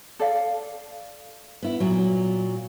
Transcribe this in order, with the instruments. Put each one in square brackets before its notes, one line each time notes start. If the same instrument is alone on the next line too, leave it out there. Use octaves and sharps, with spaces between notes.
[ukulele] A4 D5 F5
[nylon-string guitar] B3 E4
A#2 F#3